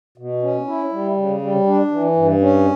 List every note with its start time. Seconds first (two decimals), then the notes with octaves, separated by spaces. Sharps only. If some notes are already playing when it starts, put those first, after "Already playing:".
0.18 B2
0.42 C#4
0.67 E4
0.92 G3
1.17 C#3
1.42 G3
1.66 D4
1.91 E3
2.16 G2
2.41 C#4